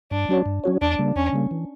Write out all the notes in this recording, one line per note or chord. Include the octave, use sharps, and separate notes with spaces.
G2 D4
F#3 C#4 F#4 C#5
G2
F#3 C#4 F#4 C#5
E2 D4
C#3 G3 A#3
E2 C#4
C#3 G3 A#3
E3